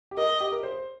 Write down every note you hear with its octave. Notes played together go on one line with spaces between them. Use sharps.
G4
A#4 D#5
G4
A#4
C5